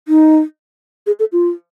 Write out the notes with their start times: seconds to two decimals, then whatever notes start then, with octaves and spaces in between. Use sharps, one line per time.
0.08 D#4
1.07 G#4
1.20 A4
1.32 F4